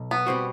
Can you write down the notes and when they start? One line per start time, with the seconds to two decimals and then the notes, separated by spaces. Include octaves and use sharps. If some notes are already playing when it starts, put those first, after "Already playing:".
Already playing: B1
0.11 B3
0.27 B2 G3 C4 F#4